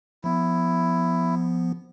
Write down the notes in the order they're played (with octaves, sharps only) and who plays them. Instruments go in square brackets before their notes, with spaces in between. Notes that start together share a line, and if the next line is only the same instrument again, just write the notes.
[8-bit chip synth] F3 B3 [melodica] E4